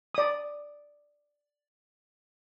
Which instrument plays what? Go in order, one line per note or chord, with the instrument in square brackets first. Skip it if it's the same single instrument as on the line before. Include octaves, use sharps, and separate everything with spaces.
[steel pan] D5 D#6